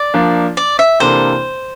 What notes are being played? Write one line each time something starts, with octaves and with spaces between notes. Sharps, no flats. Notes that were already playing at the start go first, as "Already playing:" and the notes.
Already playing: D5
F3 A#3 D4
D5
E5
C3 E3 A#3 D4 A4 C5